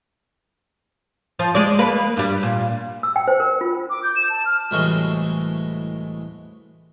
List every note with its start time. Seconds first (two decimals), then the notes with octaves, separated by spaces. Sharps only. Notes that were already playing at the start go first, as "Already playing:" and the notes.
1.39 F3
1.55 G#3 D5
1.79 A#3 B4
2.17 G2 G3
2.43 A#2
3.03 E6
3.16 G5
3.28 C5
3.40 A#4
3.61 F4
3.90 D6
4.03 G6
4.16 E7
4.30 A5
4.45 F6
4.71 C2 A2 E3 G#3 F#4 C6